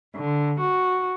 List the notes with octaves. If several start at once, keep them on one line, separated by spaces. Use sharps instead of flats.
D3
F#4